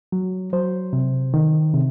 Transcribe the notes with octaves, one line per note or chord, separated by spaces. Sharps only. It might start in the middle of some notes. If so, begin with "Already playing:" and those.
F#3
F#3 C5
C3
D#3
C3